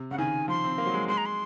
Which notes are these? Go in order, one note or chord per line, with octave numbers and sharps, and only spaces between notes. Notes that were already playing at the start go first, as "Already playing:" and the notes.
Already playing: C3
C#3 F#5
D#3 G#5
F3 C6
C4
A#3
F#3
G#3
G#3 C6
A#5
C6